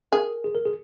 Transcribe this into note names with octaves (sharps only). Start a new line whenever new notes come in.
G#4 A#4
G#4
A#4
G#4